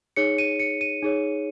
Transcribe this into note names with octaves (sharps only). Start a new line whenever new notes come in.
D#4 G#4 C#5 C#7
D#7
C#7
D#7
D#4 G#4 C#5